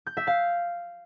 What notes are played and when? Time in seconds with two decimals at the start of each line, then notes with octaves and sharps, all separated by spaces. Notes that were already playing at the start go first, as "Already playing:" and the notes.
0.07 G6
0.17 E5
0.27 F5